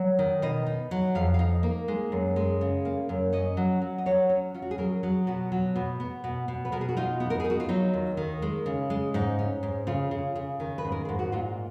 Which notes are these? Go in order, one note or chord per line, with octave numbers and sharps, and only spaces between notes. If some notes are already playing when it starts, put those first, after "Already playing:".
Already playing: F#3
D#3
B2 D#5
D#4
F#3
F2 F5
F5
D#4
A#3
G#3
F#2
G#3
C#3
A#3
F#2
C#4 D#5
F#3
F#3
D#5
F#3 C#5
C#4
C#4 F4
F#4
G#4
F#3 A#4
F#3 G#4
B2 F#4
F#3
B2
B3
B2
B2
B4
B2 A#4
G#4
F#4
D#4 F4
B3
A#4
G#4
D#4
F#4
F4
F#3 D#4
D#2
D#3
G#3
C#3
G#3
G#2 D#4
C#4
G#2
C#3 F4
C#3
C#3
D#3
B4
G#2
A#4
G#2 G#4
F#4
A#2 F4